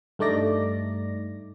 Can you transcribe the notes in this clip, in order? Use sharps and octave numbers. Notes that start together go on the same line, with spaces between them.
G2 A3 D#4 D5 A#6